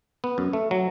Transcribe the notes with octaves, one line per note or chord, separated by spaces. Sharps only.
B3
F#2
A3
F#3